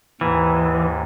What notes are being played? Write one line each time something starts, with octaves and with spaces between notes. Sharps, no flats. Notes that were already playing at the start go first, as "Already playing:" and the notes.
D#2 G#2 E3